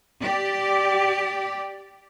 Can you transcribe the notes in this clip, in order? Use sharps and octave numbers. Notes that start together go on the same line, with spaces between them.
G4 D5